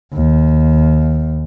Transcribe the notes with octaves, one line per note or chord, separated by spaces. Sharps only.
D#2